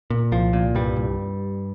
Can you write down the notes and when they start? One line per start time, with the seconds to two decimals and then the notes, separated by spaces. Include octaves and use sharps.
0.10 A#2
0.32 C2 F3
0.53 A#2
0.75 C2 G2 G3
0.96 C2